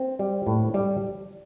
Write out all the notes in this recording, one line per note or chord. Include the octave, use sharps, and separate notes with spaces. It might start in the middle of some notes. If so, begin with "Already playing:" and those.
Already playing: C4
G3
A2
G3